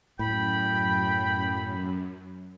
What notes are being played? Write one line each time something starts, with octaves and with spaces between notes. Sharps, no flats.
F#2 A2 G5 B5